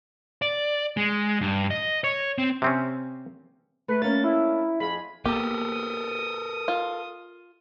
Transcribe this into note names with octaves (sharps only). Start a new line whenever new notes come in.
D5
G#3
G2
D#5
C#5
C4
C3 C4 C#4
A3 B4
A#3 C#4 D4 A6
E4
F2 G#4 B5
A#3 B3 G4 A4 A#4 D#6
F4